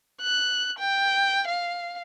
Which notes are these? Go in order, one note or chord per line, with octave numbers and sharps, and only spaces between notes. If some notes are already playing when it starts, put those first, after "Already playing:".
F#6
G5
F5